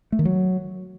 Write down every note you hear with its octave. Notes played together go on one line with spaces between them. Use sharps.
A3
D#3
F#3